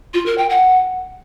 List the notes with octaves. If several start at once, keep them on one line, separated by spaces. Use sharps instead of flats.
F4
A#4
G5
F#5